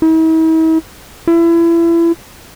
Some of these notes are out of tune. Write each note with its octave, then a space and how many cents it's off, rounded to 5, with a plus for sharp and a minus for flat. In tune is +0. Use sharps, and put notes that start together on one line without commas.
E4 -45
E4 +30